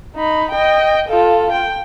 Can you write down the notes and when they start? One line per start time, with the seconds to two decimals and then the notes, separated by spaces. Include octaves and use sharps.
0.16 D#4 B5
0.52 D#5 G5
1.09 F4 A4
1.52 G5